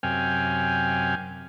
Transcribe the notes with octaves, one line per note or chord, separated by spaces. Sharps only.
F#2 C3 G5 G#5 F6